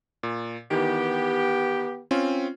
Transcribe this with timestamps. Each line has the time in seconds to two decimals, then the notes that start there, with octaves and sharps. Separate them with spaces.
0.23 A#2
0.71 D#3 E3 B3 G4
2.11 C4 C#4 F4